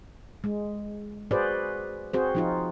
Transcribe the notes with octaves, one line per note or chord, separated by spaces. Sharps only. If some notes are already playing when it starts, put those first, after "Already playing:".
G#3
F#4 G#4 B4 C5 D5
C4 F#4 G#4 C5
F3 D#4 F4